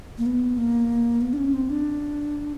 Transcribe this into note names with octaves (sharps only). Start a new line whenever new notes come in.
A#3
B3
A#3
B3
D4
C#4
C4
D4